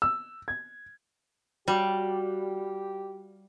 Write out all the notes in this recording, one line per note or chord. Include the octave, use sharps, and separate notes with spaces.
E6
G#6
G3 F#4 G4 D5 F5